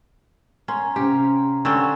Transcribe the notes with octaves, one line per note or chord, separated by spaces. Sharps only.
C#4 A#5 C6
C3 C#4 G4 F5 G5 A#5
D3 C4 C#4 C6 C#6